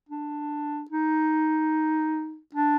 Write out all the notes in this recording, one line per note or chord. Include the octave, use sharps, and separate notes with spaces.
D4
D#4
D4